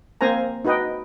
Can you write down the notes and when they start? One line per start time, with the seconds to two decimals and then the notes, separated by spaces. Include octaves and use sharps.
0.21 A#3 C4 C5 G#5 A#5
0.65 D#4 F#4 B4 D#5 G5